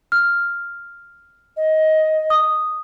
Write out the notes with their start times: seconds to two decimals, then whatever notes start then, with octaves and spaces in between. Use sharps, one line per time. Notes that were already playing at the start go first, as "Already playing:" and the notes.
0.12 F6
1.57 D#5
2.30 D#6